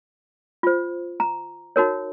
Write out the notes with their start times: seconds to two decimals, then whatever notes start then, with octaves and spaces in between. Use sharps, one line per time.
0.63 F4 C5
1.20 A#5
1.76 D#4 F#4 A#4 C#5